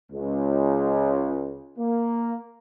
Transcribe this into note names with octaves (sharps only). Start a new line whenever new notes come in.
C#2
A#3